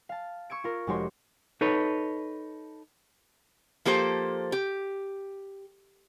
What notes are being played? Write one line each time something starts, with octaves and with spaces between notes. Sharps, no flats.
F5 A5
C#6 E6 G#6 D7
F4 A#4
F1 G#3 F#4 G4 C#5 C6
D#4 A4 B4 C#5
F3 A#3 G4 A4 C5
G4